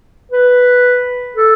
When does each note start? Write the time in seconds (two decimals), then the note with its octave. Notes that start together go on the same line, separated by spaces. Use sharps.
0.32 B4
1.36 A4